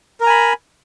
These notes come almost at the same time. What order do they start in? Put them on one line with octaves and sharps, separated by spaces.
A#4 A#5 G#5 B5